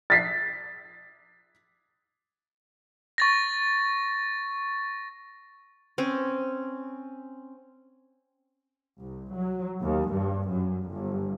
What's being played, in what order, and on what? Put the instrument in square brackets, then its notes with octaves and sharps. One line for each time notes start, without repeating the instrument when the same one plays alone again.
[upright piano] A6 B6 C7
[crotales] C#6 A6 A#6
[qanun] C4 C#4
[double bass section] C2
F#3
D#2
G2
F#2
G1